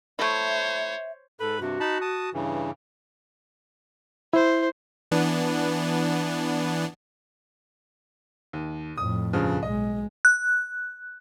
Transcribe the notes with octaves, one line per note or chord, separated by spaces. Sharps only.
A3 E4 C5 C#5 E5
G#2 A4 B4 B5
G2 C3 F#4
D#4 A5 B5
A5 D#6
G2 C#3 E3
E4 C5
E3 B3 D4
D#2
F2 A2 D#6
G2 C#3 F3
B1 G#3 D#5
F#6